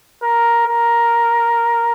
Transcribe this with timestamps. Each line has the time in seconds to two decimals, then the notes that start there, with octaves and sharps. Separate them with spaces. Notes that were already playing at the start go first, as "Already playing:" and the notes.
0.22 A#4
0.67 A#4